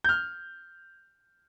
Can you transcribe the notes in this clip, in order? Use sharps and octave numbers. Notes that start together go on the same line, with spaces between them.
F6 G6